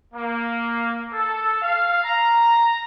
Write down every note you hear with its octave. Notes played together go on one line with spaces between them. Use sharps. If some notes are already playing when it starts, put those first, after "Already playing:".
A#3
A4
F5
A#5